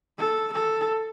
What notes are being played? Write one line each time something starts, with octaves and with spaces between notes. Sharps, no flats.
A4
A4